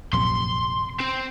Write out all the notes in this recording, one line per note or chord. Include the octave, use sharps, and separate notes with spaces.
A#1 F#2 C3 C6
C4